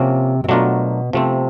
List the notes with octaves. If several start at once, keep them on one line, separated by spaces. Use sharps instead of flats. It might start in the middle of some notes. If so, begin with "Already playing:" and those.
Already playing: C3 F3 A#3 C#4
C3
B2 F#3 A3 D4 F4 A#4
C3 F3 A3 C4